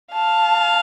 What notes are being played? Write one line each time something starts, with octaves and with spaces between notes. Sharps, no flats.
F5 A5